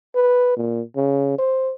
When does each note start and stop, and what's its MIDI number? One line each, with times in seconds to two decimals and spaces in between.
0.15 0.57 71
0.57 0.81 46
0.96 1.34 49
1.39 1.73 72